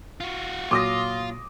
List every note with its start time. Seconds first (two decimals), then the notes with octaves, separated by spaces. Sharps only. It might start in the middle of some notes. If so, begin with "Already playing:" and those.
0.20 F4 F#4
0.71 A#2 F#3 F4 C6 D6 D#6 A#6